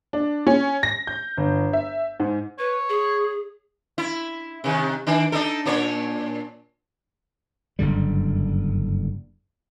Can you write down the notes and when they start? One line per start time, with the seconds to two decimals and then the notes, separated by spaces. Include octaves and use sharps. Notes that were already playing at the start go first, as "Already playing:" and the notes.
0.13 D4
0.47 C#4
0.83 A#6
1.07 G6
1.37 G1
1.73 E5
2.20 G#2
2.59 B4 C#5
2.89 G#4
3.98 E4
4.64 C3 D#3
5.07 D#3 D4
5.32 D4 D#4 A4
5.66 A#2 D4 C#5
7.79 F#1 G2 D3 G3